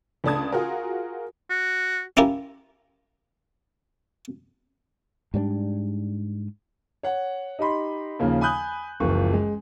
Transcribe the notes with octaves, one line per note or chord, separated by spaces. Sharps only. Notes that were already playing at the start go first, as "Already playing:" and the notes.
C#2 A3 D4 A5 D#6 G#6
F4 F#4 G#4 A#4
F#4
C#4 E4 F4 G4 A#4
G#2 G3 C4 D4
C#5 F#5
D#4 G4 D#5 B5 C6
D#2 C#3 F3 A#3
G#5 B5 D#6 F#6 G6
F#1 C#2 E3 F3 C#6
G#3